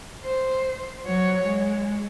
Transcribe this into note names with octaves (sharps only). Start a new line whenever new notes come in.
C5
F#3 C#5
G#3